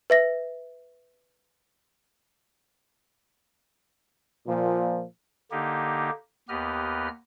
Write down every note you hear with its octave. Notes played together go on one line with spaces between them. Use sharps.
B4 E5 A#6
A#2 F3
D3 A#3 D#4 G4
D#2 B3 G4 B4 D#5 F6